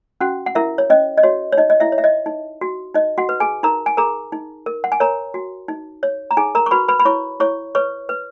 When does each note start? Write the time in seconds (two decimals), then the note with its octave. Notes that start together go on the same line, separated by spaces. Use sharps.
0.21 C#4 F#4 F#5
0.46 F#5
0.55 E4 A#4 E5
0.78 C#5
0.90 C#4 D#5
1.18 D#5
1.23 F#4 C#5
1.52 C#5
1.57 D#4 D#5
1.70 D#5
1.80 E4 E5
1.92 C#5
1.98 E5
2.04 D#5
2.26 D#4
2.61 F#4
2.94 D#4 D#5
3.18 F#4 F#5
3.29 B4
3.40 G#4 G#5
3.63 D#4 A#4 A#5
3.86 G#5
3.97 G#4 A#4 A#5
4.32 D#4
4.66 A#4
4.84 F#5
4.92 G#5
5.00 A#4 C#5 A#5
5.34 F#4
5.68 D#4
6.03 C#5
6.31 A#5
6.37 D#4 G#4 G#5
6.55 A#4 A#5
6.66 C#6
6.71 F#4 B4 B5
6.88 B4 B5
6.99 B5
7.05 E4 C#5 C#6
7.40 E4 C#5 C#6
7.75 B4 C#5 C#6
8.09 B4